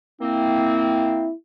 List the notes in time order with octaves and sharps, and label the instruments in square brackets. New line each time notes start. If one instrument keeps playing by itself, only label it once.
[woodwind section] A#3 C4 [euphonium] E4